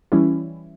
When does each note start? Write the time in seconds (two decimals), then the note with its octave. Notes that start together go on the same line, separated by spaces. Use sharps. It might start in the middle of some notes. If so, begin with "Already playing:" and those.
0.12 E3 G3 C#4 E4